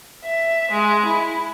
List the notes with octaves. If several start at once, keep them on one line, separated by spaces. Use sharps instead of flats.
E5
G#3
E4